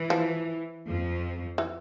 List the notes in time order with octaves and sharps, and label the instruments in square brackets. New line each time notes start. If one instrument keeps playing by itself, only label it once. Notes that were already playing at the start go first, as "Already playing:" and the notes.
Already playing: [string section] E3
[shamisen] F3
[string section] F2 F3
[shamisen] E3